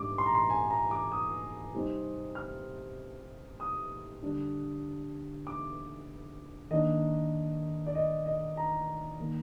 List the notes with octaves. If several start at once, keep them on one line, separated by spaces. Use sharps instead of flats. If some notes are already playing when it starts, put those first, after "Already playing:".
Already playing: G#2 G3 D4 D6
C6
A#5
C6
G#5
A#5
D6
D#6
C3 G3 C4 D#4
F6
D#6
D3 G3 D4
D6
D#3 A#3 D4 D#5
D5
D#5
D#5
A#5
D#3 A#3